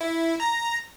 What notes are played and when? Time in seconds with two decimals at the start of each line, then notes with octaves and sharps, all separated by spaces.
0.01 E4
0.40 A#5 A#6